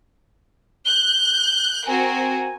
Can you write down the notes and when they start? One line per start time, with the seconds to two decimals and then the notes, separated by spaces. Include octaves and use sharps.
0.85 F#6 G6 G7
1.87 C4 F#4 A#4 G#5